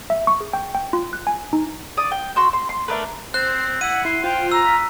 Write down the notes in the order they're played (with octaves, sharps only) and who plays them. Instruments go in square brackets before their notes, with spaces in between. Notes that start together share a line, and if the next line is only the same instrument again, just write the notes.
[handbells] E5
C#6
G#4
G5
G5
F4
F#6
G#5
D#4
[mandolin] D5 D#6
G5
F#4 C6 E6
C6
C6
A3 D4 A#4 B4
[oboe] C4 [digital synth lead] C5 [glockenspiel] F#6
[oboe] E4 [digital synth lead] F#5 [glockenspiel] D#7
[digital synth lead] E4 [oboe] C6
[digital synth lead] F4 [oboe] C5 [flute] G5
[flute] A#5 [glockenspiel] E6
[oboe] B5